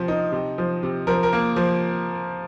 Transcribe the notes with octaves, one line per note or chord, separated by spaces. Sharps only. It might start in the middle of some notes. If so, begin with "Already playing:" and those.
Already playing: C3 F3
D#4
C3
F3
C3
F3 A#4
A#4
A#3
F3